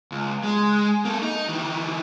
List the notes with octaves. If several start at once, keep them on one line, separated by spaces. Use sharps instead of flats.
C#2
G#3
A#3 A4
D#4
D#3 E3